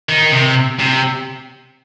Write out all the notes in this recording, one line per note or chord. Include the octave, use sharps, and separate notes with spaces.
D#3
C3
C3